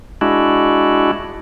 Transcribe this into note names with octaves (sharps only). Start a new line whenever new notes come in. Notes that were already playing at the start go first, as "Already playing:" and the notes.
G#3 D4 E4 F#4